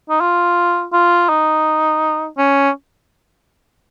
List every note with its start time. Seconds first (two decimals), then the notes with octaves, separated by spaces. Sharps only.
0.09 D#4
0.21 F4
0.93 F4
1.29 D#4
2.37 C#4